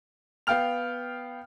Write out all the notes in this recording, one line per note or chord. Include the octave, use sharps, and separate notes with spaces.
B3 F5 G5 F6 F7